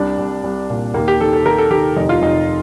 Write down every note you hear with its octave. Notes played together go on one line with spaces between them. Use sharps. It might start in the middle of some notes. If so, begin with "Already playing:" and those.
Already playing: C2 D4
C2
C2
A#2
D#2 A#3
G4
D#3 A4
A4
D#3 A#4
A4
D#3 G4
F1 D#4
F4
F1 D#4